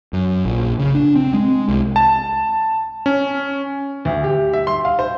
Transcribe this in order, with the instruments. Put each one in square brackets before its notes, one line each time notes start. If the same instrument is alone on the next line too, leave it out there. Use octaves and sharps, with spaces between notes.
[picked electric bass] F#2
A#1
C#3
D4
C4
G#3
C2
[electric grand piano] A5
C#4
[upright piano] D2
G4
E5
C6
F5
C5